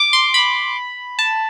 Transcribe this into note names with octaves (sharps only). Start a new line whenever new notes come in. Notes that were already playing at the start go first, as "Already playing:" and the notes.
Already playing: D6
C6
B5
A5